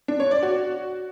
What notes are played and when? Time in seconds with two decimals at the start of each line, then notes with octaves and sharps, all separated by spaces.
0.08 D4
0.20 C#5
0.31 D5
0.43 F#4